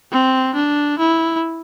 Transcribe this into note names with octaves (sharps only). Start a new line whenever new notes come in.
C4
D4
E4